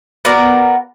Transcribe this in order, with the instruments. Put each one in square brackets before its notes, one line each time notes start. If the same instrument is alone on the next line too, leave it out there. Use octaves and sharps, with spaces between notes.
[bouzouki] B3 F#4 A#4 D5